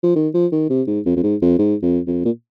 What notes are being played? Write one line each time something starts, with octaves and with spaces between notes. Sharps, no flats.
F3
D#3
F3
D#3
C3
G#2
F2
F2
G#2
F2
G#2
F2
F2
A#2